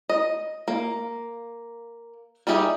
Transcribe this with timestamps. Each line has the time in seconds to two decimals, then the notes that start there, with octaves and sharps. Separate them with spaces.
0.09 D#5
0.68 A#3
2.47 G3 D#4 G4 G#4 E5